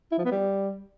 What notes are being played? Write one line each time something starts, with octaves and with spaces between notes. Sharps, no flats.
E4
F3
B3
G3